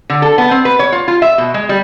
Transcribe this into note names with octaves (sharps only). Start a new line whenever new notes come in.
D3
A4
B3
C4
B4
C#5
F4
F4
E5
B2
G#3
G3